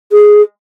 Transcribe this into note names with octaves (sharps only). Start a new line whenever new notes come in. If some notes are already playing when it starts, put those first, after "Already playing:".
G#4